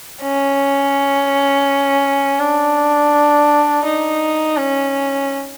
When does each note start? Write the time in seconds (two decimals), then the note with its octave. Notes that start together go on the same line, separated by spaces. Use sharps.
0.22 C#4
2.40 D4
3.85 D#4
4.57 C#4